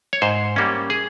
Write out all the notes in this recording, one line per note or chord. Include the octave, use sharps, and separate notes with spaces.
C#5
G#2 C5
G3 A#3 C#4
G#4